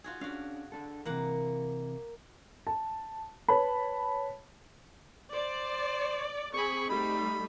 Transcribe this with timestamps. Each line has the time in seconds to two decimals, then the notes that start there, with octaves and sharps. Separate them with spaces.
0.04 F4 F#4 G#4
0.21 C#4 D4 F#4 F5
0.72 D4 A4
1.05 C3 E3 A#3 F#5
2.67 A5
3.48 B4 C#5 A5 B5
5.33 C5 D5
6.54 C4 G#4 B5 C#6
6.90 G3 A3 D#4 B5